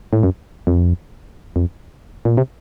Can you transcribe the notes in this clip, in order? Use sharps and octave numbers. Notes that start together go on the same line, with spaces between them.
A2
F#2
F2
F2
A#2
C3